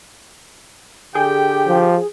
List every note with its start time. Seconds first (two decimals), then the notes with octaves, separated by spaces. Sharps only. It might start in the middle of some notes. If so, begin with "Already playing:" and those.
1.15 D3 G4 G#4 G5
1.67 F3